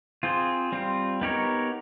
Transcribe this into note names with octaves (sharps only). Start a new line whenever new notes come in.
C4 F4 G#4 C5
G3 C4 F4
B3 D#4 G4 A#4 C#5